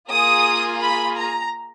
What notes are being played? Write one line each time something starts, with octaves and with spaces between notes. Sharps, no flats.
A#3 F4 G#4 D#6
B5
A#5